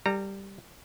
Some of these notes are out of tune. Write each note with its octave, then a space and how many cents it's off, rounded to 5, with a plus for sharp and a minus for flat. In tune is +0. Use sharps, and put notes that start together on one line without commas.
G3 +0 A4 +40 A#5 -20